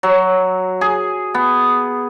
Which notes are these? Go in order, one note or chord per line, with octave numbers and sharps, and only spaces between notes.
F#3
G#4
B3